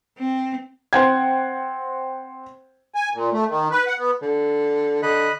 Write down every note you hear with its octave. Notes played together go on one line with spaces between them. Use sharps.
C4
C4 C5 F#5 G5 G#6
G#5
A#2
A3
D#3
B4
F#5
B3
D3
D3 D#5 B5 F#6